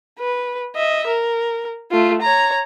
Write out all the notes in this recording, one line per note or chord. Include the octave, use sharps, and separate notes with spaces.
B4
D#5 E5
A#4
A3 F4
C#5 A#5